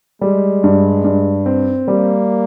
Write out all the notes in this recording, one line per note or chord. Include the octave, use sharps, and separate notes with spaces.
G3 G#3
G2
G2
C4
G3 A#3